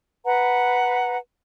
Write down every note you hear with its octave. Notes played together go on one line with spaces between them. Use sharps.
B4 F#5 A#5